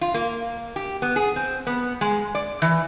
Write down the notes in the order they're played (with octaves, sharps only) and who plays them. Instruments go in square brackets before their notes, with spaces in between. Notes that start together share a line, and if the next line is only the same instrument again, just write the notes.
[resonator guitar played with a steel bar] F4
A#3
G4
B3
G#4
C4
B3
G#3
D5
E3